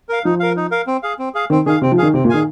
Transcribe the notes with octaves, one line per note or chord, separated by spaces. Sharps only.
A#4 F5
F3 D#4
A#4 F5
D#4
A#4 F5
C4
G#4 F5
C4
G#4 F5
D#3 C4
D#3 G#4 F5
C3 C4
F3
D#3 G#4 F5
C3 C4
A#2
D#3 G#4 F5 G#5